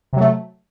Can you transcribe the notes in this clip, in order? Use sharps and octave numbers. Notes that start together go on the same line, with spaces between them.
C3 F#3 A3